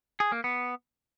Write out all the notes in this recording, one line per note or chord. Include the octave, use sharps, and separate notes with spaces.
G#4
A#3
B3